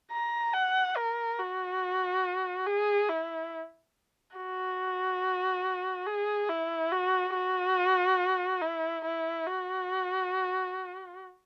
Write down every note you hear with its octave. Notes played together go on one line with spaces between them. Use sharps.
A#5
F#5
A#4
F#4
G#4
E4
F#4
G#4
E4
F#4
F#4
E4
E4
F#4